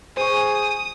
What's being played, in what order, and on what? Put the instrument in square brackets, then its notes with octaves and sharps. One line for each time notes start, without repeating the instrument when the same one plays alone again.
[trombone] G#4 [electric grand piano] C5 C#6 [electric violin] D#6